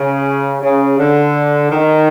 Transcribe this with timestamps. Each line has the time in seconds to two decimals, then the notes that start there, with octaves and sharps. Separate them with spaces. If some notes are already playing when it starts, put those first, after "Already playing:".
Already playing: C#3
0.61 C#3
0.98 D3
1.70 D#3